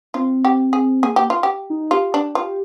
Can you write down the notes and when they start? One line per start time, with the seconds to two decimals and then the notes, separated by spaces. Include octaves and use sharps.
0.14 C4 F4
0.45 G4
0.73 G#4
1.03 A#3 G#4
1.16 G4
1.30 F4
1.43 G4
1.70 D#4
1.91 F4 G4
2.14 D4
2.35 F4 G4